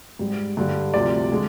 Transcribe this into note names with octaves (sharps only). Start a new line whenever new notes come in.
G#2 G3
G2 D3 G3
D2 C3 F3 D5
D3 G#3